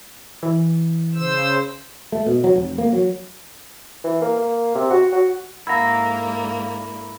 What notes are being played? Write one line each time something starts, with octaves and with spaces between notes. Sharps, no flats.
E3
C#3 C5 E6
A3
B2
F#3
F1
A#3
F#3
E3
A#3
A#3
C3
F#4
F#4
G#2 D3 A#3 E4 F5 F#5 A#5 B5